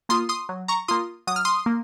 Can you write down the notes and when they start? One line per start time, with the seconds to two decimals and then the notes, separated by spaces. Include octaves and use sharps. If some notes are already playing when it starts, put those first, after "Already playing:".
0.09 A#3 F4 C6 D#6
0.29 C6 D#6
0.49 F#3
0.68 A#5 C#6
0.88 A#3 F4 C6 D#6
1.27 F#3 D#6
1.36 F6
1.45 C6 D#6
1.66 A#3